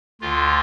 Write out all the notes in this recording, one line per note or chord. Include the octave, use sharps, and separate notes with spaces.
D2 D3 F4